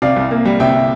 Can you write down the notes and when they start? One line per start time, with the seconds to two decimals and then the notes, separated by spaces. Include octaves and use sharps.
0.02 C3 D5 F5
0.16 C2
0.31 A#3
0.45 G3
0.60 C3 E5 G5